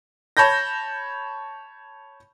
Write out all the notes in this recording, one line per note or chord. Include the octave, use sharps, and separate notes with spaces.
C#5 A5 B5 G6 A#6